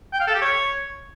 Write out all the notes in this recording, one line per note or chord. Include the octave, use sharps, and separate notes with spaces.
G5
F5
A4
G4
C#5